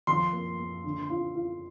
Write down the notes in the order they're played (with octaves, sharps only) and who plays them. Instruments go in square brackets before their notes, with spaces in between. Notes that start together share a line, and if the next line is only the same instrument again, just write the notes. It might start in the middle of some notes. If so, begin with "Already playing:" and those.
[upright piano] F3 [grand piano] C6
[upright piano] A#3
A#3
D3
F4
F4